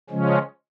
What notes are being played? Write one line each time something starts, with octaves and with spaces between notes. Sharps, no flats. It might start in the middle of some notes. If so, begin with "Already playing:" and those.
C#3 F3 G#3 C#4